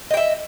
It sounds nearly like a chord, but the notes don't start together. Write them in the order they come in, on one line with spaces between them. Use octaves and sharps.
D#5 G5 E5